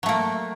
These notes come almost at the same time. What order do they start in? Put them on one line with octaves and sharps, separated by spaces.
F#3 A3 A#3